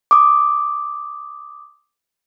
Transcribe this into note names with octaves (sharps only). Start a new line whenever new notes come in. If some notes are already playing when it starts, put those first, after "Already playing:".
D6 D#6